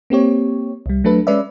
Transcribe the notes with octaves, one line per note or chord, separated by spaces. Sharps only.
A#3 C4 G4 C#5
C2 G3
F#3 A3 D4 A4 B4
G#3 C#4 B4 D5 E5